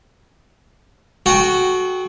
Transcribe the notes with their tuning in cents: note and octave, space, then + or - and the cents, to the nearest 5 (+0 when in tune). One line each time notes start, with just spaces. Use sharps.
F#4 +0 A4 -45 G5 +0